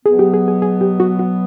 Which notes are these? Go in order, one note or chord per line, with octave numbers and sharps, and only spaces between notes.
B2 F#3 B3 G#4
G4
G#4
G#4
G#4
G4
F#4
F#4